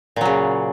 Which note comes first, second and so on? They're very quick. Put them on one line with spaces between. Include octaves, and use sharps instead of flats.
A#2 F#3 C#3